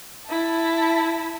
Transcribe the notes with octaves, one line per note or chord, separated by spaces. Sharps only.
E4 A5